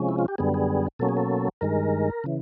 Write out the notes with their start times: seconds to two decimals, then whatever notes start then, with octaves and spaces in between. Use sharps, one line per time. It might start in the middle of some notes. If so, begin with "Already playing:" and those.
Already playing: C3 F3 G#3 C#4
0.09 E4
0.19 F4
0.28 G4
0.38 F#2 D3 G3 B3 G#4
0.54 G#4
0.99 B2 F#3 A#3 C#4 A4
1.09 G#4
1.17 A4
1.61 G2 D#3 G#3 A#4
2.24 C#3 E3